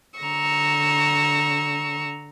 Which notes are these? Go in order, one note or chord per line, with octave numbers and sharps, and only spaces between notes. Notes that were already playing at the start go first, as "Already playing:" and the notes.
D3 A#5 C#6 E6